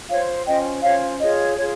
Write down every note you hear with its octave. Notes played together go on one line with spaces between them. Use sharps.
F4 C5 C#5 F5
C#4 F4 C5 D#5 G5
C#4 F4 C5 C#5 F5
F4 G#4 C#5 D#5
F4 G#4 C#5